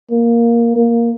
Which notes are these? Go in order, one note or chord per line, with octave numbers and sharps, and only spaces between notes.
A#3
A#3